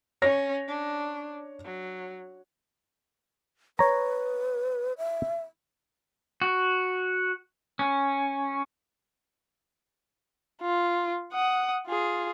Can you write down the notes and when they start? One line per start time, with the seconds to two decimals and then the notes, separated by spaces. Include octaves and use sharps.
0.22 C#4 C#5 A#6
0.68 D4
1.65 F#3
3.79 B4 C#5 A#5
4.98 E5
6.42 F#4
7.79 C#4
10.62 F4
11.33 F#5 D#6
11.87 F4 G#4